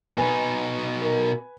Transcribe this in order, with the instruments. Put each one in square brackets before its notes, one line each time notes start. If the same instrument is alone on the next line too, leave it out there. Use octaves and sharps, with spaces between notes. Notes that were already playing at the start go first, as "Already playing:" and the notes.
[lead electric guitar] B2 D#4 [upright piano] B4 G#5
[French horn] A#4